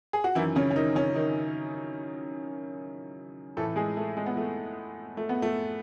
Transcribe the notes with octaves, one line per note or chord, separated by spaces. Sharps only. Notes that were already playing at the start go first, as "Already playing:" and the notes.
G#4
F#4
F#2 D#3 E3 E4
C#3 C#4
C#4
D#3 D#4
C#3 C#4
D#3 D#4
A2 E3 A3 A4
G#3 G#4
A3
G#3
B3
A3
A3
B3
A3